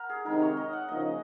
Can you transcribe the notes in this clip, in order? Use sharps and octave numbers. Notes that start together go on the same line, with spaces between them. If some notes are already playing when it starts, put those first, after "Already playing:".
Already playing: A#4 F#5
G#4
C3 D#3 G#3 C4 D#4 A#4
C#5
D#5
F#5
C#3 F3 A#3 D#4 D#5